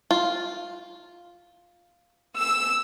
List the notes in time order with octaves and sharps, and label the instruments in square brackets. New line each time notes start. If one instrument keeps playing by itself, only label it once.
[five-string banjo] F4
[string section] E6